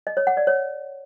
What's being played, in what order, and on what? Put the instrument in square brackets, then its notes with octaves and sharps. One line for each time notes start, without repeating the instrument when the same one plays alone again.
[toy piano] D#5
C#5
F#5
D5
C#5